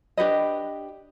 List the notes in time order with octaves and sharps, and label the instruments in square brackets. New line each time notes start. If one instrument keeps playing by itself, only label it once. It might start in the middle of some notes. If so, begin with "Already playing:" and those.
[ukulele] D4 G4 B4 D#5